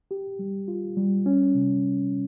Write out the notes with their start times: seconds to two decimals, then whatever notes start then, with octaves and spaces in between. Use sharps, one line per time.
0.11 G4
0.39 G3
0.68 F4
0.97 G3
1.26 C#4
1.54 C3